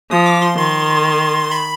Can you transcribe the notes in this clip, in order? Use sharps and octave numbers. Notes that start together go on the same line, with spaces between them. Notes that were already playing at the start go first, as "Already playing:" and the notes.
F3 D#6
D6
C6
D#3 C6
B5